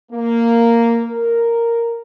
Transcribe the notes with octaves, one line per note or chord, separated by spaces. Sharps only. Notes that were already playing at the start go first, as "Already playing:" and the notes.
A#3
A#4